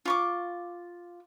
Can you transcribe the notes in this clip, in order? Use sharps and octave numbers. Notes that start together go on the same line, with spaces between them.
F4 C#6 D6